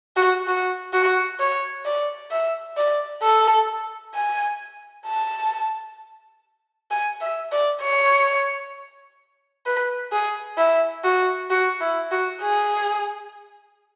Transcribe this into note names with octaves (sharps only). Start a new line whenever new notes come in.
F#4
F#4
F#4
C#5
D5
E5
D5
A4
G#5
A5
G#5
E5
D5
C#5
B4
G#4
E4
F#4
F#4
E4
F#4
G#4